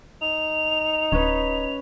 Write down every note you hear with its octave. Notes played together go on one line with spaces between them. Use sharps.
D#4 F7
D1 C#4 B4